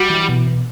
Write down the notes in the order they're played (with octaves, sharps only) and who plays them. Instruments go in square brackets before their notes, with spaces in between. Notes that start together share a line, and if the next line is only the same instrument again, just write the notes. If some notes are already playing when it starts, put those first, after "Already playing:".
Already playing: [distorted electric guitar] G3 [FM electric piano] F#4
[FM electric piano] E3
B2
B2